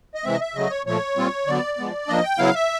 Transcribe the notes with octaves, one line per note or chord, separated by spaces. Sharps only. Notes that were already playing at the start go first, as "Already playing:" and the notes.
D#5
C3 E3 G#3 C4 E5
D#5
E5
C#3 F#3 A3 D#5
C#5
A#2 F3 A3 C#5
A#2 G3 C4 F4
D3 F#3 B3 D5
F3 G#3 B3
F3 A#3 D4 D#5
G5
C#3 F#3 B3 E4 F5
E5